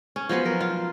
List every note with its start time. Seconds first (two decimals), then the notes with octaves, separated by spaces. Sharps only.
0.16 C#4
0.29 F3 F#3 B3 C5
0.45 A#4
0.60 F4